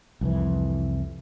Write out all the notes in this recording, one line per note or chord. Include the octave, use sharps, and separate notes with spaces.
C2 F2 E3